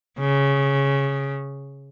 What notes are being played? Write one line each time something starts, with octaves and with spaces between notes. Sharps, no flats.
C#3